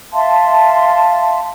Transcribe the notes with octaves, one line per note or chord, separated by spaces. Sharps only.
E5 F5 A5 C6